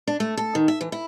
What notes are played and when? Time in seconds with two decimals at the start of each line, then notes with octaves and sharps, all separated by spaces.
0.07 D4
0.20 A3
0.37 A4
0.55 D#3
0.68 E5
0.81 E3
0.92 E4